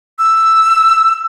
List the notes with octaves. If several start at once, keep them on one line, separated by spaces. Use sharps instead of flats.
E6